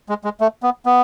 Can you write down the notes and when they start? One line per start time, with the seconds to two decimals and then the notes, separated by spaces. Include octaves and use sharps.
0.09 G#3
0.24 G#3
0.41 A3
0.63 B3
0.86 B3